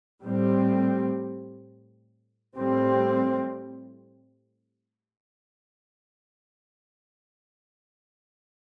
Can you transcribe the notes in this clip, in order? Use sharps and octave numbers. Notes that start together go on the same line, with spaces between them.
A2 G3 C4
A2 G3 C4